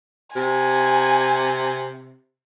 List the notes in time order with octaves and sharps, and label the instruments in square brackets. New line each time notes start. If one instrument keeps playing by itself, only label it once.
[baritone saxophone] C3 [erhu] G#5